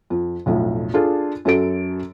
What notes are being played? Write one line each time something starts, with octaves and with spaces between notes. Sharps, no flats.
F2
B1 F2 A2
D4 F4 G#4 A4
F#2 F#3 A4 D7